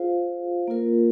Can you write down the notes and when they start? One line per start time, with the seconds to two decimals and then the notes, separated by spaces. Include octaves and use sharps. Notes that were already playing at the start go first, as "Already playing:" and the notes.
Already playing: F4 G#4 C5 F5
0.68 A#3 F4 A#4